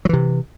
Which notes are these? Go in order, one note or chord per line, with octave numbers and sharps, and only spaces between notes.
C3 E3 F#3